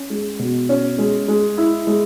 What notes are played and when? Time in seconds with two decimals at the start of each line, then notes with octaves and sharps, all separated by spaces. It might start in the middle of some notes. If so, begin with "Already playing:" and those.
Already playing: C#4
0.10 G#3
0.39 B2
0.69 C#4
0.98 G#3
1.28 G#3
1.58 E4
1.87 G#3